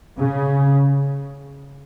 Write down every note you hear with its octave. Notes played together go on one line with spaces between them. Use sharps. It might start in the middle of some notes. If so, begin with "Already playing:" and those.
C#3